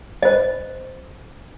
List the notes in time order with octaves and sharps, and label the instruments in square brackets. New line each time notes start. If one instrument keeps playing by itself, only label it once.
[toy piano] C5 D#5